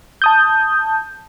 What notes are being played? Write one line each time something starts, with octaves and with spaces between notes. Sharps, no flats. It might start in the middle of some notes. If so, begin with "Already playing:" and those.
A5 D#6 G6